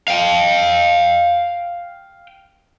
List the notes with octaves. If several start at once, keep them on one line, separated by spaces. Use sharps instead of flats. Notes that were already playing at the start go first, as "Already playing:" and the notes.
F5 G5